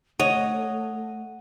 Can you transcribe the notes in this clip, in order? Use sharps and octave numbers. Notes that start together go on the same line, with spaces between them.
A3 C#5 D#5 F#5